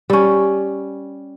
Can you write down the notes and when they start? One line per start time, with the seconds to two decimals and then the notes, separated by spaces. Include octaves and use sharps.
0.10 G3 C#4